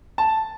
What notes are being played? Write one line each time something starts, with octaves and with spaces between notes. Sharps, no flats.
A5